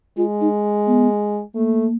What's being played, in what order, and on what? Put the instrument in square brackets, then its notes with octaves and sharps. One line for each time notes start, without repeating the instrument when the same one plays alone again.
[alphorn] G#3 [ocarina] F4
[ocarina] D#4
B3
[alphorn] A3 [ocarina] A#3